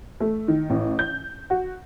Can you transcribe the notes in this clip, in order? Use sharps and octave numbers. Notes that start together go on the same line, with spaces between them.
A3
D#3
A1
G6
F#4